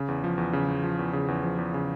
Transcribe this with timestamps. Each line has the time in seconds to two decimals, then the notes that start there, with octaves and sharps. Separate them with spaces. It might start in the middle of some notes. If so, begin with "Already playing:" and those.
Already playing: C#3
0.08 E2
0.24 F3
0.38 E2
0.53 C#3
0.68 E2
0.84 F3
0.99 E2
1.13 C#3
1.28 E2
1.43 F3
1.58 E2
1.74 C#3